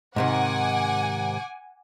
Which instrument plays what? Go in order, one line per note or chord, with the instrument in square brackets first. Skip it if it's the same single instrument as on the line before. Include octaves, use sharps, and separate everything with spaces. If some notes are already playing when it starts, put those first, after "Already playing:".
[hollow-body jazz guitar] G#2 C3 D#3 [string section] F#5 G#5 D6